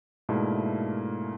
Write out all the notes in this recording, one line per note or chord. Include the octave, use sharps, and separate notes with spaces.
G#2 B2 A3 A#3 D4 E4